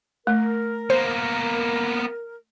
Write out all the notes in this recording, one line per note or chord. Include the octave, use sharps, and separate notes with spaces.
A3 A#4
A#3 B3 C5